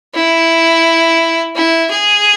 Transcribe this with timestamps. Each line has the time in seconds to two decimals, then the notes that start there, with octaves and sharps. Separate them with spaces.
0.14 E4
1.55 E4
1.91 G#4